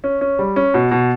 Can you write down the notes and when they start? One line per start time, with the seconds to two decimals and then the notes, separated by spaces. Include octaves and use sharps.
0.04 C#4
0.21 C#4
0.39 G3
0.56 C#4
0.74 B2
0.91 B2